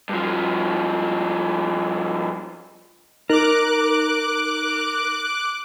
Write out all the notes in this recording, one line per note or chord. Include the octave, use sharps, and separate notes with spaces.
G2 F3
D#4 A#4 D6 F#6